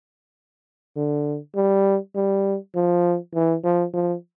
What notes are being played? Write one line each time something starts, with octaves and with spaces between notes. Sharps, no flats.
D3
G3
G3
F3
E3
F3
F3